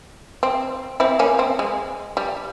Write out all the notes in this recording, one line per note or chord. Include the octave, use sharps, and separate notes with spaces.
C4
C4 E4
A#3 C#4
C4
G#3
G3